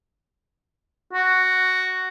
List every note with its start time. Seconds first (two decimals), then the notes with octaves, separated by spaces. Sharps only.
1.13 F#4